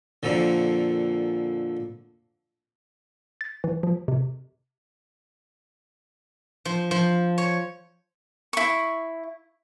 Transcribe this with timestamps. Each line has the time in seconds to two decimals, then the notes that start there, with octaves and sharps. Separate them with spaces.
0.23 F2 A#2 D3
3.41 A6
3.64 E3
3.83 F3
4.08 C3
6.65 F3
6.91 F3
7.38 C#5
8.53 E4 C#6